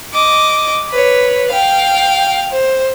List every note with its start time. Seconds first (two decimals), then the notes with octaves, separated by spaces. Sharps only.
0.13 D#5 D6
0.91 B4 C#5
1.50 F5 G5
2.51 C5